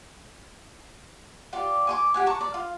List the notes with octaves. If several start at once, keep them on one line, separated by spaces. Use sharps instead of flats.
F4 G4 D5
G#5 C6 D6
G4 F#5 G#5
A5 A#5 C#6 D6
D5
F4